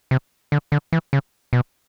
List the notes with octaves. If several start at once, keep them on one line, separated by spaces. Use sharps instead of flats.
C3
D3
D3
E3
C#3
B2